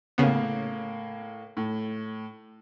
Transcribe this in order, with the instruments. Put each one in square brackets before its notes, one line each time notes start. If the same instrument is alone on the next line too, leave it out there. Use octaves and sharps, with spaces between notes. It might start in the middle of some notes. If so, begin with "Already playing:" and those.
[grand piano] A2 A#3 F5 [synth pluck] C#3 B3
[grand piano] A2